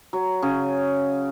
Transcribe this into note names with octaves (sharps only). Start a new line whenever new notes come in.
F#3
C#3